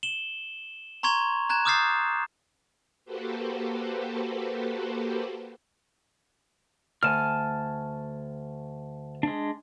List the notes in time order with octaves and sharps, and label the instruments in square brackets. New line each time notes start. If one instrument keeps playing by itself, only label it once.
[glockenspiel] E7 F#7 G7
A#5 C6 C#6 G#6 F7
A#5 F#6 G#6 E7
D6 D#6 F6 G6 A6 C7
[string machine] A#3 F#4 G4 A4 B4 C5
[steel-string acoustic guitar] D2 [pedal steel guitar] G#5 A5 F6
[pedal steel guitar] G#3 D4